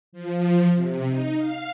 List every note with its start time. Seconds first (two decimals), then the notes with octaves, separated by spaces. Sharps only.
0.12 F3
0.76 C3
1.07 D#4
1.38 F5